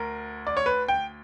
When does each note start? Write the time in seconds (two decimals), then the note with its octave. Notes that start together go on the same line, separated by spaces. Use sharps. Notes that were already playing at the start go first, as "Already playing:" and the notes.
Already playing: D2 A#4
0.47 D5
0.57 C#5
0.66 B4
0.88 G5